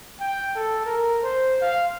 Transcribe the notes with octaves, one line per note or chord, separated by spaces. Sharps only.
G5
A4
A#4
C5
F5